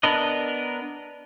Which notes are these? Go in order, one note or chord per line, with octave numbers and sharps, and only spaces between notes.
B3 D4 A#4 B4 D#5